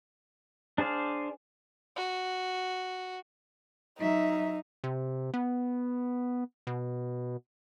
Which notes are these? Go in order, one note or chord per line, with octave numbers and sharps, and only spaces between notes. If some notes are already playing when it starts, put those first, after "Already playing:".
D4 G#4 C5 D5 F5
F#4
F#3 D#4 E5
C3
B3
B2